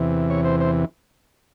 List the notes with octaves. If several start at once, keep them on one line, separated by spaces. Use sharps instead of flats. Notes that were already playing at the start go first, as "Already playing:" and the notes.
Already playing: E2 C3 E3
C#5
C5
C5